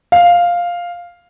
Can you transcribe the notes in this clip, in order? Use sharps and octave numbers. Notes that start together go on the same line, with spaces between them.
F5